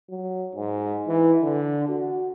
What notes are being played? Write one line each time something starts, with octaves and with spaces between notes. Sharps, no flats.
F#3
G#2
E3
D3
F#4